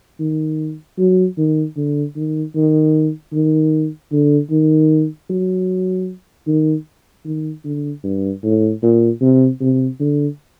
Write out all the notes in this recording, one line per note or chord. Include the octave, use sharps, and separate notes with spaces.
D#3
F#3
D#3
D3
D#3
D#3
D#3
D3
D#3
F#3
D#3
D#3
D3
G2
A2
A#2
C3
C3
D3